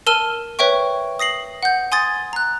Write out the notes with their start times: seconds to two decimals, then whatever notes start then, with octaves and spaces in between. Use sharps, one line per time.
0.07 A#4 A5 E6 F6 D#7 G7
0.59 B4 C#5 E5 G5 C#6
1.19 D#6 A#6 C7 F#7
1.63 F#5 G6
1.92 G#5 C6 D#6 G#6 A6
2.33 A#5 F#6